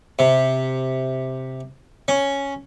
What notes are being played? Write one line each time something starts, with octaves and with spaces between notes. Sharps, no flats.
C3
C#4